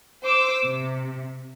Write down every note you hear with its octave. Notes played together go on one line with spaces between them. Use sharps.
C5 D6 E6
C3